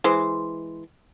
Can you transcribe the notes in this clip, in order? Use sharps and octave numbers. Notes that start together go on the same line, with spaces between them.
E3 G#3 C5